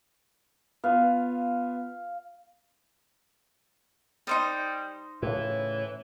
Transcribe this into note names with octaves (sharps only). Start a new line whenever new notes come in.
B3 F4 F5
G3 D#4 C5 D#5
A2 C#3 E3